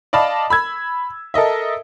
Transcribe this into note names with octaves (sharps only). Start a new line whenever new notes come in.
D5 D#5 F5 A5 B5
B5 E6 G#6
A4 A#4 D#5 E5